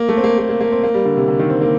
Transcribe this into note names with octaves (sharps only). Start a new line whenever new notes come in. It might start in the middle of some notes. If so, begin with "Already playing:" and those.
Already playing: A#3
A3
C4
A#3
A#3
A#3
A#3
C4
A#3
G3
D3
C3
D3
D#3
C4
A#3